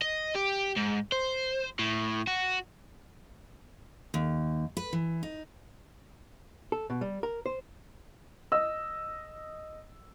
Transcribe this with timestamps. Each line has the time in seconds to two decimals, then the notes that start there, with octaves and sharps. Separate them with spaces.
0.02 D#5
0.36 G4
0.77 G#2
1.12 C5
1.79 A2
2.27 F#4
4.14 D#2
4.77 B4
4.93 E3
5.23 D#4
6.72 A4
6.90 B2
7.01 G3
7.23 A#4
7.46 C5
8.52 D#5 E6